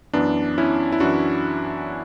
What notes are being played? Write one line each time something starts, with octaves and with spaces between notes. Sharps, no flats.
F#2 E3 B3 D4
C#4 E4
E4
F#2 E3 D4 F#4